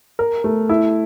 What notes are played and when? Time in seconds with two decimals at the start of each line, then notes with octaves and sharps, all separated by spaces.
0.19 A#4
0.44 A3
0.69 E4